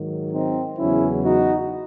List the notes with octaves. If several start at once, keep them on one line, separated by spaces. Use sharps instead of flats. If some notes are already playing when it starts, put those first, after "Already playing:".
Already playing: G#2 D#3 F#3
C4 D#4
E2 C#3 F#3 C#4 E4
D#4 F#4